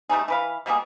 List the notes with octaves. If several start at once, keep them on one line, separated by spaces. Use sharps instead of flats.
G3 A3 D#4 G#4
E3 B4 F5
B2 G3 A#3 G#4